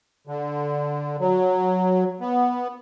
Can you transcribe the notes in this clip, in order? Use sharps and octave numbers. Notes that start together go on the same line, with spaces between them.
D3
F#3
B3